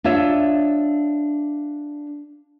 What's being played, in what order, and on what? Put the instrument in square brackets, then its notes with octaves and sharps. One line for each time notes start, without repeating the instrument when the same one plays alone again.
[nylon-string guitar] D4 F4 C#5 E5